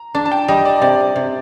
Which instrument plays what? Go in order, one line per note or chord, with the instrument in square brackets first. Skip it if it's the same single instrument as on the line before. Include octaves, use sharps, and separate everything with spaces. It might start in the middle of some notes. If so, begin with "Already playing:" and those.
Already playing: [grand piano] A#5
[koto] D4 [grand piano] A5
[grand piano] A5
G5
[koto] G3 [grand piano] D#5
[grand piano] D5
[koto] C3 [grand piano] D5
[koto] C3